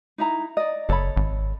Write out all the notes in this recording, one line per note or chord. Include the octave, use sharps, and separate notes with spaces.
D#4 E4 A#5
D5 D#5
F#1 A4 C#5 B5
G#1